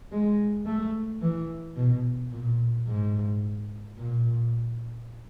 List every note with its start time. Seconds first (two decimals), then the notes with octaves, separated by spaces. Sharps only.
0.12 G#3
0.66 A3
1.22 E3
1.77 B2
2.32 A#2
2.87 G#2
3.98 A#2